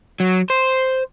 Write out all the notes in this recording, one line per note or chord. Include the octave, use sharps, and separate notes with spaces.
F#3
C5